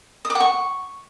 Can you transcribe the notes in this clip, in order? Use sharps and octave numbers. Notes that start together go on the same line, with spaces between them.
D#6
D6
F#5
C#6